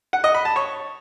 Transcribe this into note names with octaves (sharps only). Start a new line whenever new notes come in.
F#5
D#5
B5
A5
C#5